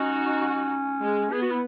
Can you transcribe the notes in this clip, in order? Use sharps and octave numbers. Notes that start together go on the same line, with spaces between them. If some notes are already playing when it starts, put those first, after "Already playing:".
Already playing: C#4 D#4 F#4
G#3
B3 G#4
F#4
E4